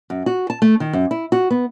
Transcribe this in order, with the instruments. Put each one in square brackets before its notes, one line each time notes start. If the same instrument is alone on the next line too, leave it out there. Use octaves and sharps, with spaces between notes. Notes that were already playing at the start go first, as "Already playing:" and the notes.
[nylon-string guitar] F#2
F#4
A5
A3
D#3
F#2
E4
F#4
B3